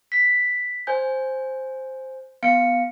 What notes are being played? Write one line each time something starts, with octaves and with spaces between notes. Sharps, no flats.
B6
C5 G#5 G6
B3 F5 C#7 D7